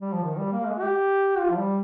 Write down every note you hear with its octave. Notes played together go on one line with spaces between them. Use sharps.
G3
F3
D#3
G3
A#3
G#3
G4
F4
F3
G3